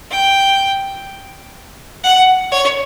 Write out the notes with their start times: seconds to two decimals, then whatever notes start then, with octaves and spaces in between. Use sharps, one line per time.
0.10 G5
2.03 F#5
2.51 C#5